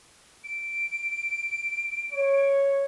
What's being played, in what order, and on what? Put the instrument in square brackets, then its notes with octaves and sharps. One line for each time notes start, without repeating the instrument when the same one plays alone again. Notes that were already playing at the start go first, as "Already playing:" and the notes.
[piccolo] D7
[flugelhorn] C#5